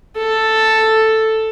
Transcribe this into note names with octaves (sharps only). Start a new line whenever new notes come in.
A4